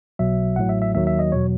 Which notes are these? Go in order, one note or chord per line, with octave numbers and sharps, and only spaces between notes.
B1 B2 F#3 E5
A1 A2 F#3 F#5
E5
E5
D#2 D#3 F#3 E5
E5
D#5
E2 B2 F#3 C#5